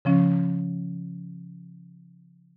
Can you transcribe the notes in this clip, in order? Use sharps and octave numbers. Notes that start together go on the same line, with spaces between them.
C#3 F3 C#4